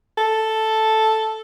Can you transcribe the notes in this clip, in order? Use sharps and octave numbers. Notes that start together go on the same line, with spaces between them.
A4